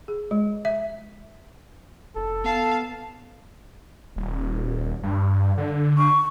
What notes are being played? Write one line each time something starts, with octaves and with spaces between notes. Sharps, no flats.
G#4
G#3
E5
F1 A4
B3 F5 A5
D#1
G2
D3
C#6